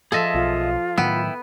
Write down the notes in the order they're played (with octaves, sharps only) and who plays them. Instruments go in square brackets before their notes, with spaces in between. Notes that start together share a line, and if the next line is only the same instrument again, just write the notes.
[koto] F3 A4 [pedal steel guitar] G#4 D#5 E5
[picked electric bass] B1 [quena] F4
[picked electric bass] A2 D#3 F#3 [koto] B3 [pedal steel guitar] E4 G5 E6